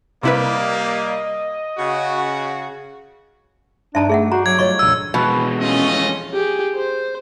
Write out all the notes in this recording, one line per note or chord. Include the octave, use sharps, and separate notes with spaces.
C3 G3 A#3 E4 B4 D#5
C#3 F#4
G2 D4 D#4 E5 A5 A#5 D7
A3 G#4 E5 F#5
F#4 D5 A#5 G6 C7
F#3 C#6 D6 G#6
G3 A3 F4 C#5 D#5 C#6
E1 A#1 E6 D#7
F2 B2 E3 G#3
A3 C#4 F4 D#5
G4 G#4
C5